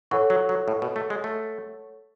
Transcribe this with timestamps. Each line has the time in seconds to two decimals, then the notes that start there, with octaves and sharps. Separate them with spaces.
0.11 E3 A4 C#5 F#5 C#6
0.30 F#3
0.49 F#3
0.68 A2
0.82 B2
0.96 A3
1.10 G#3
1.24 A3